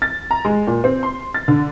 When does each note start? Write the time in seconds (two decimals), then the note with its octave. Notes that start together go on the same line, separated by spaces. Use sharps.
0.02 A6
0.31 A#5
0.45 G#3
0.67 A#2
0.84 C4
1.03 C6
1.34 A6
1.48 D3